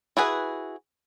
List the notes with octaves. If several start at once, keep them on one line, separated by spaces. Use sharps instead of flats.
E4 F#4 G#4 B4